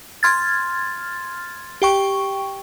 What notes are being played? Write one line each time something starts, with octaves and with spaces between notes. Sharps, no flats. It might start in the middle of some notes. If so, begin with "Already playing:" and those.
C6 F6 G#6 A6
G4 G5 C#6